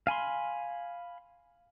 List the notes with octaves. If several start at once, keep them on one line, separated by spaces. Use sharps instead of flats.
F5 G#5 B5 C6